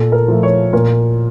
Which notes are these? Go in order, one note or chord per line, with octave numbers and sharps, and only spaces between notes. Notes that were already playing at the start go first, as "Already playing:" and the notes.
Already playing: A#2 A4
A#4
F3 A3
C#5
A#2 A#4